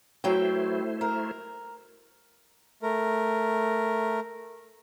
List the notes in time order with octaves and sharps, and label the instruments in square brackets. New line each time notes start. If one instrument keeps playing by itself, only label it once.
[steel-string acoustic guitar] F#3 B4 G5 [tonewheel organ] A3 E4 C5
[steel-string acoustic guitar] A#4
[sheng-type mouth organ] A3 A#4